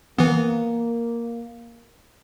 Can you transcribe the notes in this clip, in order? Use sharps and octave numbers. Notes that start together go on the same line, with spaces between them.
E3 A#3 B3